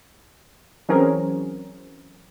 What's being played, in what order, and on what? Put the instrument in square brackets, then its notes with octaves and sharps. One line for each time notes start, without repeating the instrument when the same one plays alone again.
[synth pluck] E3 F#3 C4 C#4 G#4 A#4